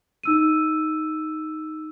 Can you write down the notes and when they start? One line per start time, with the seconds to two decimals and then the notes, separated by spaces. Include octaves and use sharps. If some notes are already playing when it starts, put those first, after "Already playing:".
0.23 D#4 E6 D#7